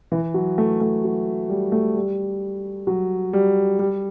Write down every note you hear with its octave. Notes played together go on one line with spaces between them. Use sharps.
E3
F#3
A3
A3
F#3
G3
A3
G3
F#3
G3
G3